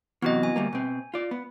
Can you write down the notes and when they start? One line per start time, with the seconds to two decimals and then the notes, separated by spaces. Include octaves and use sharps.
0.22 F#2 C3 E3 B3 F#4 D#5
0.43 G#5
0.56 D2 G3 A#3
0.73 B2 C4
1.14 F4 D5
1.31 B3